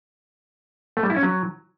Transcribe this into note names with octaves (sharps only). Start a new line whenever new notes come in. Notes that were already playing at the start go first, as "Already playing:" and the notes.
A3
G3
E4
C#4
F#3